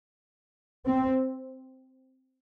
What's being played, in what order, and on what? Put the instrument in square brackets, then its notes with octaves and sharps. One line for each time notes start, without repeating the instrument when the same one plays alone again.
[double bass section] C4